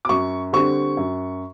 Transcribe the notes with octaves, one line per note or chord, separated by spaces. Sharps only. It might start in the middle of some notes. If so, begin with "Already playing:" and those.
D6
F#2 C#6
D3 G3 C4 C#6
F#2